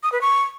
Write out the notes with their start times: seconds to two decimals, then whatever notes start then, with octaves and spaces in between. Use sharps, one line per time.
0.03 D#6
0.12 B4
0.21 C#6